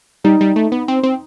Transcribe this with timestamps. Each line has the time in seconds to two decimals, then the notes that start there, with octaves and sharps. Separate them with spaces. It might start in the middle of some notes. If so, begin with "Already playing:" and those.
0.24 G3 D#4
0.41 G3
0.56 A3
0.72 B3
0.88 C4
1.03 C4